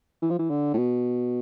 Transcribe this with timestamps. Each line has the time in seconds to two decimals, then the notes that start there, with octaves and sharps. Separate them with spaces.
0.22 E3
0.30 F3
0.39 E3
0.50 D3
0.74 A2
0.78 B2